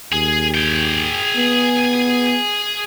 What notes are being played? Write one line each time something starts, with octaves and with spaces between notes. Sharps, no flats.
D#2 G#4
G#4 G5
B3